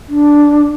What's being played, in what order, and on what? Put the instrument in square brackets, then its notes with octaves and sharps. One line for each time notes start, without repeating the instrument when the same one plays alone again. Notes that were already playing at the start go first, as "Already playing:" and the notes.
[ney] D4